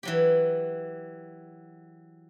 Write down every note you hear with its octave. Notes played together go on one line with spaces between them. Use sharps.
E3 F#3 G4